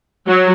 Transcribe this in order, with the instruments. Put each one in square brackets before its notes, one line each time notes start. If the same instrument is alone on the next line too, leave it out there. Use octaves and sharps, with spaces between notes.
[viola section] F#3